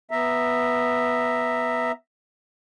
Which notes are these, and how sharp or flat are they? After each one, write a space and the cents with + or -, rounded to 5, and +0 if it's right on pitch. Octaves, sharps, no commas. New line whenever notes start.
B3 -5 E5 +0 A#5 -5